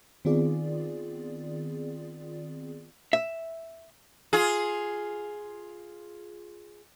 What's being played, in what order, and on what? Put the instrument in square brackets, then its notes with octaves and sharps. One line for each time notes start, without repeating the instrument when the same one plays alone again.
[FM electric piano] D#3 B3 C4 F4 G#4 D5
[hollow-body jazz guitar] E5
[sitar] F4 G#4